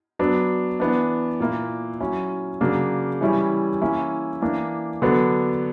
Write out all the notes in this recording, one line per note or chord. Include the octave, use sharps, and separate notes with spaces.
F#3 B3 D4
E3 B3 D4
A#2 A#3 E4
F#3 C#4 E4
C#3 F#3 A#3 D4
E3 G3 C#4 E4
E3 A#3 C#4 E4
E3 A#3 D4
D3 F#3 B3 D4